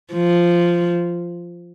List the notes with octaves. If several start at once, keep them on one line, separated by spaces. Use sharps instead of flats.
F3